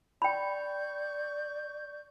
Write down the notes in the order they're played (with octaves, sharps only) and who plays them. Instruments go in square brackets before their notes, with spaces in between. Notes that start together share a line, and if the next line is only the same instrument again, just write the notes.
[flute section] D5 C#6 G6 [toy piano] G5 B5